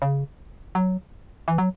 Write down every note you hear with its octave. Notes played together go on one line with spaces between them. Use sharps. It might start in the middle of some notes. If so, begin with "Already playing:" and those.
C#3
F#3
E3
F#3